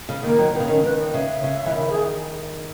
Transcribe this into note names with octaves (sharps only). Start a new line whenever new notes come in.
C#3
D#3 A#3
D#3 F#3
D#3 B3
C#3
D#3 C#4
D#3 B4
D#5
C#3 E5
C#3
E3
D#3
G#4